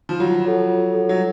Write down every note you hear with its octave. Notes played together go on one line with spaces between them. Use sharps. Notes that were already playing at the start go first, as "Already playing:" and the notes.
F3
F#3 F4
A4 C#5 F#5
F4
A4 C#5 F#5
F#3